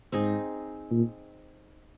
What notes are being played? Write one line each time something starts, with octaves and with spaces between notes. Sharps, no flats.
G#2 C4 D#4 G#4
A#2